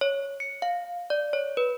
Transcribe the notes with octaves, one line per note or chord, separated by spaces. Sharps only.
C#5
C#7
F5
D5
C#5
B4